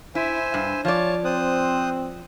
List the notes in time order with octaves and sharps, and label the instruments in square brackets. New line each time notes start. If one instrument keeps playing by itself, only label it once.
[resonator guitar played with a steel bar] E4 [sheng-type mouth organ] C5 E5 G#5
[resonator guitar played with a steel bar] G2
[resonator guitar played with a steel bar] F3 D5 [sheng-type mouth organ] C#5 A5
[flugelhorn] C4 [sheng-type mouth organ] C5 D#6 F#6